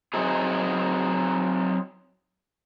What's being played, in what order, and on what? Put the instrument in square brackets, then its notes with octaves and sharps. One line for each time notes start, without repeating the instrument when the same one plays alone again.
[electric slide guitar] F#3 C4 D#4 E4 G#4